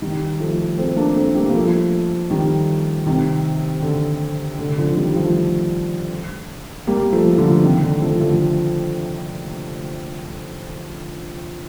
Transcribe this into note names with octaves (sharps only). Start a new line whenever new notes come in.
D#3 G3
F3 A3
A3 C4
A#3 D4
A3 C4
G3 A#3
A#3
F3 A3
D#3 G3
C3 D#3
D3
D3
D3 F3
D#3 G3
F3 A3
G3 A#3
F3 A3
D3 F3
C3 D#3
D3
F3 A3
D3 F3